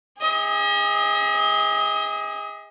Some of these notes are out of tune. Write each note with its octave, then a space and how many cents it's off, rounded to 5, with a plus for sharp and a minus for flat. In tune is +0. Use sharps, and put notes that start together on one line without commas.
G#4 -30 D#5 +40